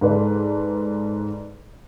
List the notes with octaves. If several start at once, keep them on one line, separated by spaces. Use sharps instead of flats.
G#2 A4 B4 D5